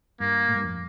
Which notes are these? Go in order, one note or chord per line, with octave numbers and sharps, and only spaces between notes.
G2 A#3
A2
G2
F2